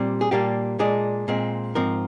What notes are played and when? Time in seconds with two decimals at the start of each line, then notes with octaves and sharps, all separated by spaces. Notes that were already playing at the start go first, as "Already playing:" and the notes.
Already playing: A#2 G3 C4
0.21 G#4
0.31 A#2 G3 A#3 D4 G4
0.79 A#2 G#3 D4 G#4
1.28 A#2 G#3 C4
1.75 G#2 F3 C4 A#4